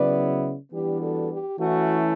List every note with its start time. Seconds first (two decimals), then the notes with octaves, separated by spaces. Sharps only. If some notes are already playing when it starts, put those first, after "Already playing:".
Already playing: C#3 F#3 B3 E4 B4 D5
0.72 E3 G3 B3 D4 G4
1.01 F#4 A4
1.30 G4
1.59 E3 A3 C#4 E4 F#4